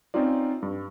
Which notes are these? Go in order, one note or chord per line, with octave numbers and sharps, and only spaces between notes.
C4 C#4 D#4 F4 D5
G2